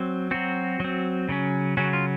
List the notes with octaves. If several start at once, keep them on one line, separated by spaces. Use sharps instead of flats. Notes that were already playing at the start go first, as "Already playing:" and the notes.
Already playing: F#3 C4
F#3 C4 F#4
F#3 C4
C#3 F#3 C#4
C#3 F#3 C#4 F#4
F4